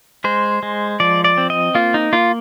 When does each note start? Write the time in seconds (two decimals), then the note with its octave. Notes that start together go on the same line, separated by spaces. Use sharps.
0.24 G#3 C5
0.63 G#3
1.00 F3 D5
1.24 D5
1.38 C4
1.50 D#5
1.75 A#3 F4
1.94 D#4
2.13 A#3 F4